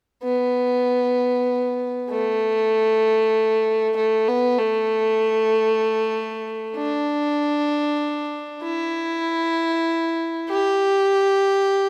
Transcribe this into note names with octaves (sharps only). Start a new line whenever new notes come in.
B3
A3
A3
B3
A3
D4
E4
G4